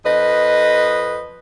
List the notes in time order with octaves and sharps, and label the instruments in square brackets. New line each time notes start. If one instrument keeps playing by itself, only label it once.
[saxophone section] F2 B4 D#5